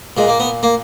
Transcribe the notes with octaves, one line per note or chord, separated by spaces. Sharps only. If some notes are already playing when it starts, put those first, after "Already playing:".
A#2 G#3
A#3
B3
A#3